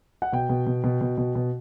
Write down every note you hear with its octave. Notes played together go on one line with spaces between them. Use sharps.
F#5
B2 G5
B2
B2
B2
B2
B2
B2